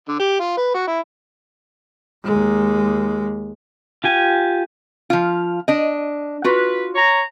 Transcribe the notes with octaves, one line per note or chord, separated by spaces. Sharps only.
D3
G4
F4
B4
F#4
E4
D#2 G#3
F4 G4 G#5
F3 F4
D4 D#5
F4 F#4 B4
C#5 A#5